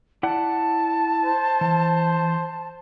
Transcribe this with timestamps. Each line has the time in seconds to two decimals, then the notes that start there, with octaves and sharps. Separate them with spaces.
0.23 E4 D5 F#5 A5
1.25 C5
1.61 E3